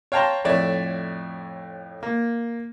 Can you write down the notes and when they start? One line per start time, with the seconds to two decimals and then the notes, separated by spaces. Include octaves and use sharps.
0.12 C#5 F5 G5 A5 A#5 C6
0.45 F2 A2 C#5 D5 E5
2.03 A#3